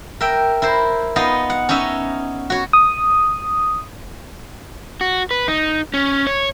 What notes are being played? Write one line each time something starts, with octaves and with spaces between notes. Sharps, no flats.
A#4 E5 G5
E4 A#4 C5
B3 D#4 F4 D#5
F#5
C#4 D#4 D#5 E5
F#4 C#5
D#6
F#4
B4
D#4
C#4
C#5